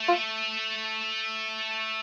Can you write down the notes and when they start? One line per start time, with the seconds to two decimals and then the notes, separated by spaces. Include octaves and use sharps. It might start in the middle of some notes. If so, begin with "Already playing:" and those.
Already playing: A3
0.08 F4